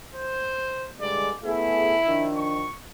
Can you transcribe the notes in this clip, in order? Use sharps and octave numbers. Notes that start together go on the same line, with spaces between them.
C5
G2 D3 G#3 D5
A3 B3 E4 G#4
D#3 F3 D4
C#6